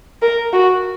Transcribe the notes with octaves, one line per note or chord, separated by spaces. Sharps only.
A#4
F#4